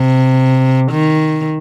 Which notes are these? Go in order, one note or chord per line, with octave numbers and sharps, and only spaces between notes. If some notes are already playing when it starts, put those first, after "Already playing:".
Already playing: C3
D#3